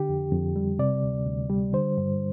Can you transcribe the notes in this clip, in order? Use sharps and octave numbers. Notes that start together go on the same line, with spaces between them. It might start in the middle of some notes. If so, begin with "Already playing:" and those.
Already playing: D3 G4
F2
F2
G3
C3 D5
D2
D2
G3
D3 C5
G2